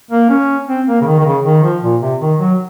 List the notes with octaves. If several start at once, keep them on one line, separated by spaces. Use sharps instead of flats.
A#3
C#4
C4
A#3
C#3
D#3
D#3
C#3
D#3
F3
A#2
C3
D#3
F#3